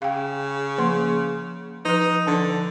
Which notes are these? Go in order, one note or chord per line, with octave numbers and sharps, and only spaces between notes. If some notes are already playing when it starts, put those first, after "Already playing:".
C#3 F5 G5
F3 A#3 C6
F3 D#4 B4
D3 F3 D4